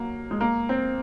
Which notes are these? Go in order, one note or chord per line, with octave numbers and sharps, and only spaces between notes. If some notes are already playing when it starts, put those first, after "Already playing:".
Already playing: F#3 A#3
G#3
A#3
C4